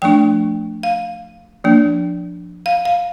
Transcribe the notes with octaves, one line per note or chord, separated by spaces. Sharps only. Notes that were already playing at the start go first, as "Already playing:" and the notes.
F3 A3 D4 G5
F5
F3 A#3 D4
F5
F5